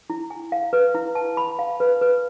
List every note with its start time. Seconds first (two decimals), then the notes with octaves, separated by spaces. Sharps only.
0.10 E4
0.30 G#5
0.52 F5
0.73 B4
0.95 E4
1.15 A5
1.37 B5
1.59 F5
1.80 B4
2.01 B4